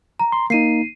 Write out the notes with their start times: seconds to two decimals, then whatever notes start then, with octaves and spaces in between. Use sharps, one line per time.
0.20 A#5
0.32 C6
0.50 A#3 D#4 C7 D#7